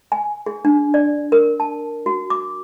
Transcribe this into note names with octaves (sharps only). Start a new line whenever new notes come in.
G#5
G#4
D4
D5
A#4
A5
F#4
D6